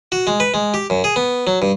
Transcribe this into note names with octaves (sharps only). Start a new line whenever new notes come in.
F#4
G#3
B4
G#3
G4
F#2
G#4
B3
F#3
G2